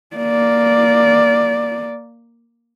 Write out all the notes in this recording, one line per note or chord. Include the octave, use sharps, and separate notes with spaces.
A#3 D5